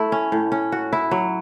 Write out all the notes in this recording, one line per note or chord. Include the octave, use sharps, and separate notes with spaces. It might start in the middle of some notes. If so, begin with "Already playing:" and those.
Already playing: A3 E4
C#4
A2
C#4
F#4
E4
F#3